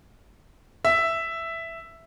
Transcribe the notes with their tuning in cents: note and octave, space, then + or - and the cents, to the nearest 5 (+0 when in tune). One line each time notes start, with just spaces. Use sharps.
E5 +5